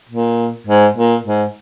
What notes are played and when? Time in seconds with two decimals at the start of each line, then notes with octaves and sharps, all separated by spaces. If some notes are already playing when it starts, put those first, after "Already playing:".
0.09 A#2
0.67 G#2
0.96 A#2
1.25 G#2